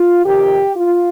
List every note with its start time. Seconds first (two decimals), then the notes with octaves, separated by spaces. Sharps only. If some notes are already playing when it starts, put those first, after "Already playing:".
Already playing: F4
0.24 F2 C3 D#3 G4
0.76 F4